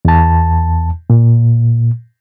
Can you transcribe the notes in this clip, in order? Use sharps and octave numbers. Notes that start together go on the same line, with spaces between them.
E2 A5
A#2